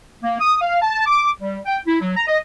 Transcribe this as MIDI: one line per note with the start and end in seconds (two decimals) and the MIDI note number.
0.23 0.37 58
0.40 0.58 87
0.61 0.78 77
0.82 1.06 81
1.06 1.29 86
1.41 1.60 55
1.66 1.79 79
1.87 2.01 64
2.01 2.12 54
2.16 2.23 82
2.28 2.38 75